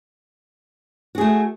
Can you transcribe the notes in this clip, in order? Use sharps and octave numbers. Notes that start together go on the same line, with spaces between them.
A3 F#4 G#4